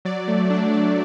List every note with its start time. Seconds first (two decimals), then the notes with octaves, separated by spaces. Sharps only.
0.05 F#3 D5
0.28 A3
0.50 D4
0.73 D4